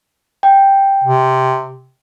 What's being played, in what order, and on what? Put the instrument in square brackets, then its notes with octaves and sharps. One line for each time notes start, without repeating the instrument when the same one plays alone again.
[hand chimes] G5
[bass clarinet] C3